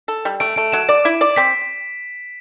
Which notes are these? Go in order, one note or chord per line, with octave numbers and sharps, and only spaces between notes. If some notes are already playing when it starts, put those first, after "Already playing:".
A4
G3
A3 D7
A3 D7
F#3 E7
D5 D7
E4
D5
C4 B6